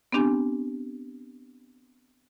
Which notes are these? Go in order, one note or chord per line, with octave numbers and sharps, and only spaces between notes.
B3 C4 D4 G4 G#5